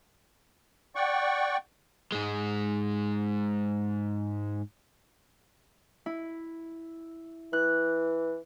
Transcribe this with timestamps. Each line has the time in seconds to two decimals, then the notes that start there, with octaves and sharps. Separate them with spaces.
0.96 D5 F#5 G5 C#6
2.12 G#2 G#3
6.06 E4
7.53 E3 F#6